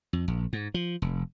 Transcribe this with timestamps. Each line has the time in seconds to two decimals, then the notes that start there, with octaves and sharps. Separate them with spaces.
0.13 F2
0.28 A#1
0.53 G#2
0.74 F3
1.02 F1